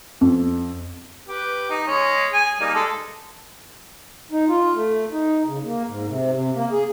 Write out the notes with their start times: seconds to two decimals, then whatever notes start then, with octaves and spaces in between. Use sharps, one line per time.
0.21 F2
1.28 G4 B4
1.70 D#4
1.86 G#3 C#4
2.33 G#4 G#5
2.60 G3 A#3 D#4
2.74 G#3 A4
4.32 D#4
4.48 F4
4.74 A3
5.12 D#4
5.46 C#3
5.64 A#3
5.87 G#2
6.08 C3
6.32 C3
6.55 A#3
6.72 G#4